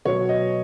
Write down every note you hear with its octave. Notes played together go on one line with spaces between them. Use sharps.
B2 F#3 B3 C#5
D#5